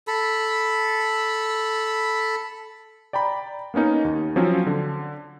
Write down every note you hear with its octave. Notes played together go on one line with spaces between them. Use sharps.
A4 B5
D5 G5 A#5 B5
A#3 B3 C#4 D#4 A#4
D#2
F3 F#3 C4 C#4
D3